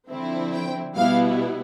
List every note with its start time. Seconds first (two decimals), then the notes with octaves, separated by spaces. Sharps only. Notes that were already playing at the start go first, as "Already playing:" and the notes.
0.09 D3 F3 C4 E4
0.53 G5
0.96 B2 G3 B3 E4 F5